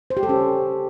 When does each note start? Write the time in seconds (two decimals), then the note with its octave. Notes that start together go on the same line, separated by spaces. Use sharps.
0.10 C5
0.17 G4
0.23 A4
0.29 C#4